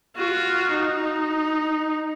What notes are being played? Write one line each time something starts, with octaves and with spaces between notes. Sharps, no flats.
F4 F#4
D#4